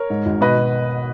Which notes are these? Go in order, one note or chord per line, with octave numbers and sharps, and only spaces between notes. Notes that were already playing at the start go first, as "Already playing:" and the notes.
Already playing: A#4 C#5
G#2
G#1
B2 B4 D#5
B2